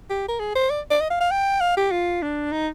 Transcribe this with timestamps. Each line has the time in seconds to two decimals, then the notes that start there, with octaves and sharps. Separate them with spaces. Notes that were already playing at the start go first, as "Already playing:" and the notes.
0.10 G4
0.28 A#4
0.39 G#4
0.55 C5
0.70 D5
0.90 D5
1.01 D#5
1.10 F5
1.20 F5
1.31 G5
1.61 F5
1.77 G4
1.92 F4
2.22 D4
2.52 D#4